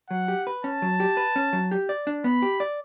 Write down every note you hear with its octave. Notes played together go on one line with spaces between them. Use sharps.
F#3 F#5
G4
B4
C#4 A5
F#3
G4
B4
C#4
F#3
G4
D5
D4
B3 B5
G4
D5